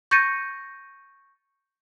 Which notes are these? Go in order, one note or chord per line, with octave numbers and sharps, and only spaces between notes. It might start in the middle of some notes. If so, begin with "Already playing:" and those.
C#6 G6 A6 A#6 C#7 D#7